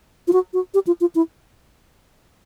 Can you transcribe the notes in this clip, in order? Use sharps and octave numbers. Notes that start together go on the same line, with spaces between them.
F4
F#4
F#4
G4
F4
F4
E4